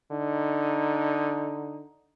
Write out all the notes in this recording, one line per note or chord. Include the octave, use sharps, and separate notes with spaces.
D3 D#4